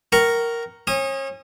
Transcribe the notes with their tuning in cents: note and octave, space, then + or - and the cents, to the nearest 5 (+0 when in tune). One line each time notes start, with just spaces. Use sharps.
A#4 +0 G5 -45 C#6 +0
C#4 -35 D#6 +0